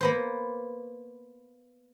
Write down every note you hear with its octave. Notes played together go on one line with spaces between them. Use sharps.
A#3 B3 C5